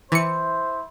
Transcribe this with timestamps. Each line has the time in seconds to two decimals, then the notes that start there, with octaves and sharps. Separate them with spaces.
0.12 E3 E4 C5 C#7